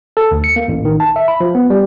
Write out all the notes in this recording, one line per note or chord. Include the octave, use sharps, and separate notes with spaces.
A4
D2
C#7
A#3
A1
D#3
A5
E5
B5
F3
B3
G3